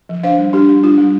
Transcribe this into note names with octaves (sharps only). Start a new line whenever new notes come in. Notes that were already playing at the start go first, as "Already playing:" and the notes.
F3
D4 C5 F5
G3
D4 G4
G3
D4 F4
G3